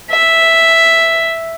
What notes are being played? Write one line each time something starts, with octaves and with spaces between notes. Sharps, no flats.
E5